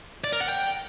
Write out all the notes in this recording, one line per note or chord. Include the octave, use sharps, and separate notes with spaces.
D5
A#4
F#5
G5